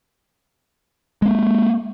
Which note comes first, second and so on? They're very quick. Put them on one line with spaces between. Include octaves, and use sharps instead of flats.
G#3 C4 A#3